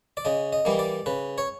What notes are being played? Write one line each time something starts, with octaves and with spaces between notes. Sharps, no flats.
D5
C#3 D#5
D#5
E3 G3 A#3
D5
C#3 B4
C#5